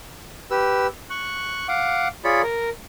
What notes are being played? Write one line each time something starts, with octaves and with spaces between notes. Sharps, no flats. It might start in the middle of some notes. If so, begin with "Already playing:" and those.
G4 B4 E6
C#6 F#6
F5 F#5 D6
F4 G#4 C#5 D5 B5
A#4